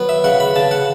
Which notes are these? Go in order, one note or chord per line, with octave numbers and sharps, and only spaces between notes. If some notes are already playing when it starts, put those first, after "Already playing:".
Already playing: F#3 B3
E5
C#3 F#5
B5
C#3 A5
F#5